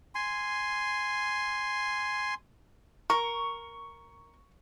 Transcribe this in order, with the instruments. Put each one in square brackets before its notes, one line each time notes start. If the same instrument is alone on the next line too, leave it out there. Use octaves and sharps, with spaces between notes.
[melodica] G#5 C6
[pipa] A#4 [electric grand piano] C#6